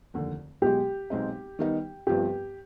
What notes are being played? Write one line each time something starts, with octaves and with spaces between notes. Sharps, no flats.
F1 D#2 D3
B1 B2 G#3 G4
B1 B2 G#3 C4 D#4
D#3 G3 B3 D#4
G1 G2 F3 C4 G4